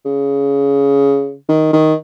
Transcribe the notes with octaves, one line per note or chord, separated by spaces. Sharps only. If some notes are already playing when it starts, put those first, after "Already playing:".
C#3
D#3
D#3